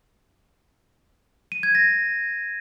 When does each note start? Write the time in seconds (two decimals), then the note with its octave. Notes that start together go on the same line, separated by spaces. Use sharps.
1.52 D#7
1.63 G#6
1.75 A#6